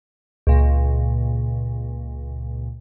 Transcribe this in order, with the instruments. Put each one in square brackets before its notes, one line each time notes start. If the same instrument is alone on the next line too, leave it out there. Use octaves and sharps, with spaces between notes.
[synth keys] C#2 A#2